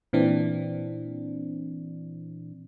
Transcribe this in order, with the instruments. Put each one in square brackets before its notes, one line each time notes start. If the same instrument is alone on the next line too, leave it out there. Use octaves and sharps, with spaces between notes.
[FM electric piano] A#2 E3 C4 D4